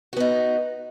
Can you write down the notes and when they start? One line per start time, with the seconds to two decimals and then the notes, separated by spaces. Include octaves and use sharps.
0.13 F#4
0.17 B3
0.20 D#4